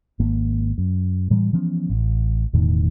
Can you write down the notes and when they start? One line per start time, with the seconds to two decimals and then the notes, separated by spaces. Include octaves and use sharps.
0.20 G#1 A#3
0.78 F#2
1.30 A2 E3 G3
1.53 E3 F3 B3 C#4
1.90 A1
2.53 E1 E2 A2 D#3